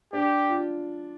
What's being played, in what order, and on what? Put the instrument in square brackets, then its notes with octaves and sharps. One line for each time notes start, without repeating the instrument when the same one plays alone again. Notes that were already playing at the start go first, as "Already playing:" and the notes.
[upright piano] D4 [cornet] G4
[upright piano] F4